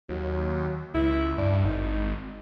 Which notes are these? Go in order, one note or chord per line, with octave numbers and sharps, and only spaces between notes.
D#2 F#3
C#2 E4
G2 D5
G#1 D#4